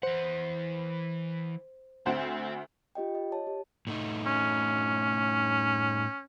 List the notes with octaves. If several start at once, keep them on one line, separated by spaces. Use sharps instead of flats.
E3 C5 F#5
D2 C4 C5 F#5
F4 G4 D#5 G5
D#5
C#5 A5
G4
A2 A3 D#4
C#4